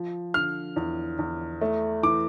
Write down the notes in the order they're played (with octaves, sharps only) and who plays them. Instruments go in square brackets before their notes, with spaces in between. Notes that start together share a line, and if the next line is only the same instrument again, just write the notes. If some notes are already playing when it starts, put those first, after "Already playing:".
Already playing: [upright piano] F3
[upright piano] D3 [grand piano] F6
[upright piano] E2
E2
A3
[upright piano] E3 [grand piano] D6